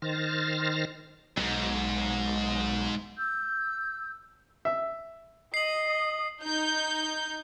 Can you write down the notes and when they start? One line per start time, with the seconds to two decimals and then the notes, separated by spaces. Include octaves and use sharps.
0.02 D#3 C5 F6 A6 A#6
1.37 B1 F2 G#2
3.17 E6 G6
4.65 E5
5.54 D#5 D#6 C7 F#7
6.43 D#4 G6